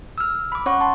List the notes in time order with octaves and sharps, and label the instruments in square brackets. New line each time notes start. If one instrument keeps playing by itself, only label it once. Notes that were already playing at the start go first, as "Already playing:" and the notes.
[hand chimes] E6 F6
B5 D6
C#4 C#5 F#5 C#6
A5 C6